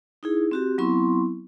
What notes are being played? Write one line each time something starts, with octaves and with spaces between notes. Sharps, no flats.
D#4 E4 G#4
C4 F#4 G4
F#3 B3 C4 E4 C6 C#6